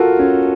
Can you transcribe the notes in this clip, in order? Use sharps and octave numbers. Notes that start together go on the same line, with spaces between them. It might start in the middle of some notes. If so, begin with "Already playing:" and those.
Already playing: F4 F#4 A4 A#4
C#4